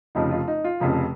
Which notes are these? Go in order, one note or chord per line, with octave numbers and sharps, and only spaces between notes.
F1 F2 C#3 F3 D#4
F4
D#4
F4
F1 F2 C#3 F3